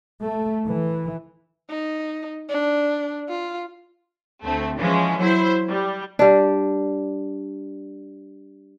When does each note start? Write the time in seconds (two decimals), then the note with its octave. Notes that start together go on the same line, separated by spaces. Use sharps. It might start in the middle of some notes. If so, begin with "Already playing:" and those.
0.22 A3
0.65 E3
1.70 D#4
2.49 D4
3.29 F4
4.44 D2 A3 C4
4.78 E3 F3 G#3 C#4
5.18 F#3 E4 C5
5.68 G3
6.19 G3 D4